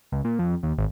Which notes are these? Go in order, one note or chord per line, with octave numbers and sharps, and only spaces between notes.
C#2
A#2
F2
D#2
G#1